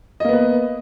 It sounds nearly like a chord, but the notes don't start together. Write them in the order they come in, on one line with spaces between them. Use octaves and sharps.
D#5 A#3 B3 B4